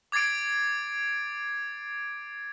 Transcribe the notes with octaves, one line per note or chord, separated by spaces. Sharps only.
D6 G#6 A6 C7 D7